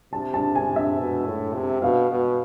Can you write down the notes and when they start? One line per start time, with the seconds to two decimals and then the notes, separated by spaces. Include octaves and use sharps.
0.13 C3 A5
0.34 A5
0.55 G#5
0.76 E5
0.98 B2
1.26 A2
1.53 C3
1.82 B2 F5
2.10 B2